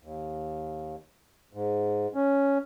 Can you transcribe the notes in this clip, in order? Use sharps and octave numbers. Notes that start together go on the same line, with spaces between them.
D#2
G#2
C#4